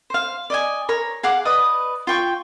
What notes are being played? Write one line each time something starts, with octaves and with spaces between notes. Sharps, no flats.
C5 F5
D5 D#5 G#5
A#4 C#5
G#4 F5 F#5 D6
B4 D5 D#5 D#6
F4 G5 C#6